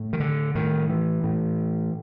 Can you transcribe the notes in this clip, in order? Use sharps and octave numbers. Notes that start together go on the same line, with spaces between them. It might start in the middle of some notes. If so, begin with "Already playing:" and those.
Already playing: A2
D#3
D3
A2 D#3
E3
A2